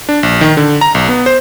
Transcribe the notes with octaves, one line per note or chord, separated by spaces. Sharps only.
D4
A#1
D#3
D3
A#5
B1
B3
C5